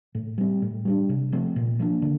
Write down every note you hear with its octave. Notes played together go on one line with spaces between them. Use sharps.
A2
G3 C4
A2
G3 A#3 D4
C3
F3 A3 C4
A#2
F3 A#3 D4
D3